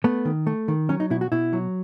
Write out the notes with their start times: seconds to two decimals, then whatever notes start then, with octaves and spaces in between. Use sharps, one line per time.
0.04 A3 B3
0.25 D#3
0.47 A3
0.68 D#3
0.89 F#3 C#4
1.00 D#4
1.10 B2 E4
1.21 F#4
1.32 B2 E4
1.53 F#3